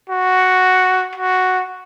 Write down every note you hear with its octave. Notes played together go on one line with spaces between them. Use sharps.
F#4
F#4